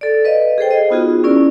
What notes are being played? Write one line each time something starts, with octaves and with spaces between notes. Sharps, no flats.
A4 D5
B4 D#5 F5
G#4 A4 C5 G5
D#5
B3 D#4 F4 F#4 G#4
C#4 E4 A#4 D5